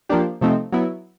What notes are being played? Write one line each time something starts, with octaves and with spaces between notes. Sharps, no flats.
F3 A#3 D4 G4
C3 F3 A3 C4 D#4
F#3 B3 E4